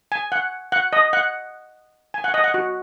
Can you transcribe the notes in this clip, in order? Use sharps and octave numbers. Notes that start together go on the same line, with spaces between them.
G#5
F#5
F#5
D#5
F#5
G#5
F#5
D#5
F#5
F#4